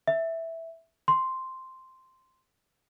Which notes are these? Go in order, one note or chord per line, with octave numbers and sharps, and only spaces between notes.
E5
C6